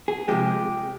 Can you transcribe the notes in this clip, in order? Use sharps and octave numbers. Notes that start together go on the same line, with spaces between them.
G#4
C3 F3 G#3 G4